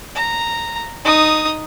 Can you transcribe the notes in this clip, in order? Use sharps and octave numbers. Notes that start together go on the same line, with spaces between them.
A#5
D#4 D#6